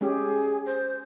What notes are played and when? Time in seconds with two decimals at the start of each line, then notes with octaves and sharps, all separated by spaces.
0.01 G#3 C#4 G4 G#4
0.66 C5